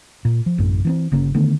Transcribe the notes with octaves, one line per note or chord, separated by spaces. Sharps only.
A#2
F3
A1 F#2 A2
E3 B3 C4
G1 C#3 A#3 C#4
D3 D#3 A3 B3